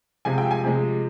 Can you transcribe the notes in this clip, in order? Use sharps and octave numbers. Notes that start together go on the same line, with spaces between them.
C3 F3 G#3 G#5
G5
G#5
C3 F3 G#3